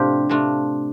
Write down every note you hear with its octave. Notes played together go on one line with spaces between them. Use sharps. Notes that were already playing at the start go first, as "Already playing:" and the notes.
Already playing: A2 C3 A3 D4 F4 G4 C5
C3 A3 D4 F4